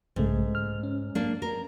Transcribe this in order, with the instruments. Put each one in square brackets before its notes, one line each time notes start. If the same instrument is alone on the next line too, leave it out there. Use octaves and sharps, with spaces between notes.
[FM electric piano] B1 C#3 A3 [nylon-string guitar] G#2
[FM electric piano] F6
C#4
[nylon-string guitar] A#3 D4
A#4